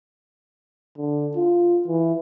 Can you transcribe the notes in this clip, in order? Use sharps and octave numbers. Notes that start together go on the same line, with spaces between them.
D3
F4
E3